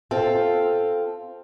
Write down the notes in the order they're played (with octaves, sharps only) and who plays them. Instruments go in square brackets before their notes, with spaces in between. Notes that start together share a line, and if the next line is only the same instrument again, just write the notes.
[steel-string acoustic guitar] C4 F4 A4